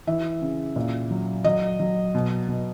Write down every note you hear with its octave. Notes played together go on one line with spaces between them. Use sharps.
E3 E5
C#3
A#2
F#3
F#3 D#5
F#3
B2
B2